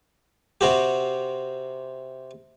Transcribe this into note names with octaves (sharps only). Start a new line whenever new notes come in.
C3 C4 F#4 G4